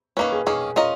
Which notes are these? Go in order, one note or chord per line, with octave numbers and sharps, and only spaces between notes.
D#3 A#3 C#4 B4
G#4
D#3 A#3 C#4 G#4
C#4 F4 A#4 D#5